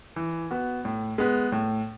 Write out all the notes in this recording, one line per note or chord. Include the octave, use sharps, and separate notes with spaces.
E3
B3 F#4
A2
G#3 B3
A2